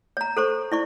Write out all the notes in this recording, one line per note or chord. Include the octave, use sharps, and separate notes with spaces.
C#5 A#5
A4 C5 C#6
E4 D5 C#6